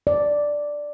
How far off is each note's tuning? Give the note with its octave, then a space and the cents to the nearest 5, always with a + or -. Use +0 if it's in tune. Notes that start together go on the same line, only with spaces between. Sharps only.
D5 +0